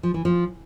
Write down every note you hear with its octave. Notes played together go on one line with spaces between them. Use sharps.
F3
E3
F3